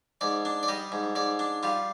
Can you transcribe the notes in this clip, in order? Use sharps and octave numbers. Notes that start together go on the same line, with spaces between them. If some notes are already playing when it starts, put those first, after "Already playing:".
G#2 D5
D4
D5
G3 D#5
G#2
G#2 D5
D4
G3 F4